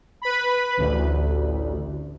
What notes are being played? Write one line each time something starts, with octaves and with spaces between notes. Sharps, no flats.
B4 B5
A1 D2